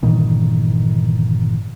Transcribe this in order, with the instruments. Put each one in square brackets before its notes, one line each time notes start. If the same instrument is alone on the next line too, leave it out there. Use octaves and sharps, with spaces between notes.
[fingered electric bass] G1 A#2 D#3 E3